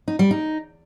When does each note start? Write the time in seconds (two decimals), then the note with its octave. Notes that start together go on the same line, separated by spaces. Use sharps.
0.08 D#4
0.19 G3
0.31 D#4